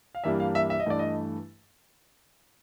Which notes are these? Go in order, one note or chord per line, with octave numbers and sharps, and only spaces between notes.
F5
G2 E3 G3 A#3 D4 E5
F5
E5
E5
D#5
G2 E3 A3 D5
D#5